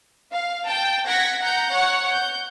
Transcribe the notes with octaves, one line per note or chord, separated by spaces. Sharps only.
F5
G5 A5
F#5 G#6 A#6 B6
F#5 A#5 G6
C#5 F#5
G6